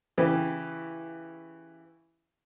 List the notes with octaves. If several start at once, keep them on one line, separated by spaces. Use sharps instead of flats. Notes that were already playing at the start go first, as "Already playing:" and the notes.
C#3 E3 G4